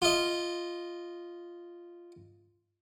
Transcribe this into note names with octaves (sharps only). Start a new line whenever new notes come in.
F4 D#5